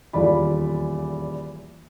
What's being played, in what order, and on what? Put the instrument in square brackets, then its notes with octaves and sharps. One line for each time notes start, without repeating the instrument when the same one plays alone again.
[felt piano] D#1 E2 F4 D5 B5